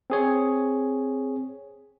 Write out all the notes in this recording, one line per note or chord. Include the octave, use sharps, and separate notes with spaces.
C4 G#4 C#5